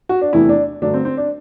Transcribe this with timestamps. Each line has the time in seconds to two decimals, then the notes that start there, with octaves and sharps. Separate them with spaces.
0.09 F#4
0.21 D4
0.33 E2 C3 E3 A3 E4
0.49 D4
0.82 G2 D3 F#3 A3 D4
0.94 C4
1.05 C4
1.17 D4